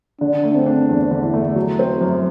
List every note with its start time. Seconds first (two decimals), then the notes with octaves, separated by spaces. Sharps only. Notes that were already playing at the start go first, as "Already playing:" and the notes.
0.21 D3 D4
0.44 A3
0.55 C4
0.66 D4
0.89 E2
1.11 D3
1.23 E4
1.34 A3
1.56 F#3
1.79 C4
2.01 F#2